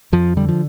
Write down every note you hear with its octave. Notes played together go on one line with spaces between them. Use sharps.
F2 F3
D3 G3
F3